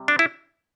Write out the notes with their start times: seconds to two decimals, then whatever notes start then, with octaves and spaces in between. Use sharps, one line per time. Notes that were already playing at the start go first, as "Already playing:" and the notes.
Already playing: C3 G3
0.08 D4
0.19 E4